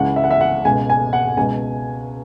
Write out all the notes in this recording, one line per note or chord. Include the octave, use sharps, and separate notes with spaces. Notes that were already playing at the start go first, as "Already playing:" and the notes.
Already playing: C#2 C#3 E3 F#5
E5
F#5
E5
F#5
C#2 B2 G#5
G#5
F#5
C#2 B2 G#5